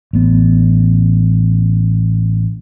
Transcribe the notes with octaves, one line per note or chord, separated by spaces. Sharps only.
A1 B3